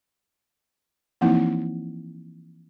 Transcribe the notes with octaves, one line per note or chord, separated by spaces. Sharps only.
E3 F3 A#3 C4 D#4 E4